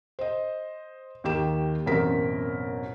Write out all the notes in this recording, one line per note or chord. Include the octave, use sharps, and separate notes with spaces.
C5 D#5
D#2 D#3 G4 E7
A1 F#2 B2 C4 A#4 B6